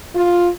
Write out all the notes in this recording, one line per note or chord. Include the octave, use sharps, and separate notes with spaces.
F4